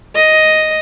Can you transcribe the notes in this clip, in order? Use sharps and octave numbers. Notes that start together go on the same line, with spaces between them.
D#5